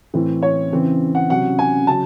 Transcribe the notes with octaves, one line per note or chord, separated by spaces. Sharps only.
A2 E3 C4
C#5
C#3 E3 C4
F#5
C3 F#3 C#4 F#5
G#5
C#3 F#3 C#4 A5